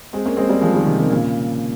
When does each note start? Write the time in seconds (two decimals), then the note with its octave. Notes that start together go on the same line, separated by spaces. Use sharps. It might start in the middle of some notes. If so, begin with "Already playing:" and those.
0.13 G#3 C4
0.25 A#3 C#4
0.37 G#3 C4
0.49 G3 A#3
0.61 F3 G#3
0.74 D#3 G3
0.86 C3 D#3
0.98 C3 D#3
1.10 A#2 C#3